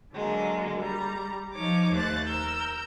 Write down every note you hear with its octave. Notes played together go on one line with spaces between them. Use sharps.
D3 F#3 G#3 A#3
G3 A#5
F3 D#4 C#5 D6
D#2 A3 C5 F#6 A6
A#4 E6 G6